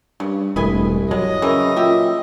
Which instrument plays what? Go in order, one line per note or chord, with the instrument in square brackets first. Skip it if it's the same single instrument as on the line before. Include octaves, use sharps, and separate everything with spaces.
[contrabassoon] G2 [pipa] C#3
[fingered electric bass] E1 G2 A3 [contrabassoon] C2 [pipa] B4 D#5 G#5
[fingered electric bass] F#3 [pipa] G#3 [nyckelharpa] D#5
[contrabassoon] C#3 [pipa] E3 A#4
[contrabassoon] A#2 [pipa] G4 E5